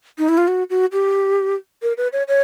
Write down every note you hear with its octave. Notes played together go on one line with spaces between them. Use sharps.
D#4
E4
F4
F#4
F#4
G4
A#4
B4
C#5
C#5